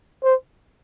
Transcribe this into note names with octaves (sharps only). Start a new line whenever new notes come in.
C5